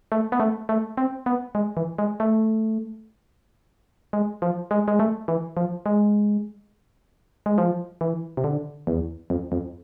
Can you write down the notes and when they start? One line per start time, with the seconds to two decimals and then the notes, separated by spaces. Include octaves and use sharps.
0.12 A3
0.32 B3
0.40 A3
0.69 A3
0.97 C4
1.26 B3
1.55 G#3
1.77 E3
1.98 G#3
2.20 A3
4.13 G#3
4.42 F3
4.71 G#3
4.88 G#3
5.00 A3
5.28 E3
5.57 F3
5.86 G#3
7.46 G#3
7.58 F3
8.01 E3
8.37 C3
8.44 D3
8.87 E2
9.30 F2
9.52 F2